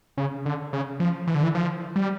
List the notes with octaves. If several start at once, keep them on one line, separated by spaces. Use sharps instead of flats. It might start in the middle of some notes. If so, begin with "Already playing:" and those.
C#3
D3
C#3
F3
E3
D3
E3
F3
G3